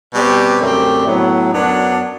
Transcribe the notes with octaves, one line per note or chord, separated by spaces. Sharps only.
B2 G3 C4 G4
F#2 D3 A3 C4 G4
A2 F#3 B3
F#2 F#3 B3 D4